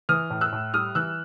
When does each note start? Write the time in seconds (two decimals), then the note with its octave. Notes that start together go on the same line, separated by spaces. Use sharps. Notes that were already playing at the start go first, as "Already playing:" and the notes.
0.09 E3 D#6 F6
0.30 A2
0.41 E6 F#6
0.52 A2
0.74 G3 D#6 F6
0.95 E3 E6 F#6